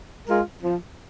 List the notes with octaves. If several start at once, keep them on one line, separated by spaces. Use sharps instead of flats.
G#3 F4 A#4
F3